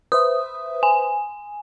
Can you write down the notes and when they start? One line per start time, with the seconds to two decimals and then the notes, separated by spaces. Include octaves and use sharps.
0.12 B4 C5 E5 D#6
0.83 G#5